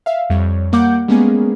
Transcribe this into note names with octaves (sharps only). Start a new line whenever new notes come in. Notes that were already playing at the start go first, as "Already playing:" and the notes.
E5 F5
F2 G3 C#5
G3 A#3 F#5 D6 G6
G3 G#3 A#3 B3 C#4 G#4